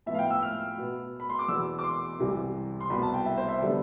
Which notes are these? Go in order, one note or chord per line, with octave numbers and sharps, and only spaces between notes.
A2 F3 B3 E5
F5
G5
E6
F6
B2 B3
B5
C6
D6
E2 B2 B3 E6
D6
C6
C2 C3 E3
C6
C2 B2 B3 B5
A5
G5
E5
C5
E5
D3 G3 B3 A4